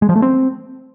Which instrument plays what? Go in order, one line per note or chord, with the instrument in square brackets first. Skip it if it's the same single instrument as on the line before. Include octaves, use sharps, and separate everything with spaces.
[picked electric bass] G#3
F3
A3
C4